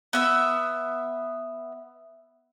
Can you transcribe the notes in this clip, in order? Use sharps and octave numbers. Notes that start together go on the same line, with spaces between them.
B3 E5 E6